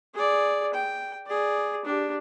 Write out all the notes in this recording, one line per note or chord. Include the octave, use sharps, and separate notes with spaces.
G#4 D5
G5
G#4 D5
D4 G4